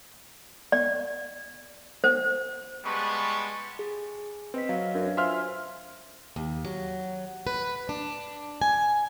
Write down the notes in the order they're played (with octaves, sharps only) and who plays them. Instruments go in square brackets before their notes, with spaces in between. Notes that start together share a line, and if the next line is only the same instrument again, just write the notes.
[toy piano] D5
C5
[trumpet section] G3 G#3 B3 B4 A5 C#6
[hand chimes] G#4
[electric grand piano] C4 [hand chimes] B4 D#5 B6
[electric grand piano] F#3 [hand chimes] F5
[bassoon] F#2 [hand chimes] D4 F5
[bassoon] F4 [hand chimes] C5 G#5 [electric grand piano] E5 C6 F6
[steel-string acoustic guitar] D#2
F#3
B4
D4
G#5